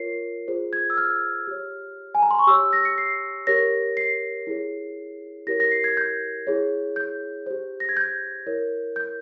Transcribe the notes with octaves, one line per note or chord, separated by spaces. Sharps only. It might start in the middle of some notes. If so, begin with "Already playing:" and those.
Already playing: F4 A#4 C#5 C7
F4 G#4 C5
G#6
E6
F6
G4 C#5
G#5
A#5
C6
C#6
G4 C#5 E6
A#6
C#7
C7
G4 A#4 C#5 A#6
C7
E4 G#4 C#5
E4 G4 A#4 C#5 A#6
A#6
C7
G#6
G6
E4 G#4 C#5
G6
G4 C5
A#6
G#6
G6
E4 A#4 C#5
G6